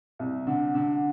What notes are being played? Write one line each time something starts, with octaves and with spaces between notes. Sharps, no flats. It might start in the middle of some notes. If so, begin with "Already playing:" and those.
C2
D3
D3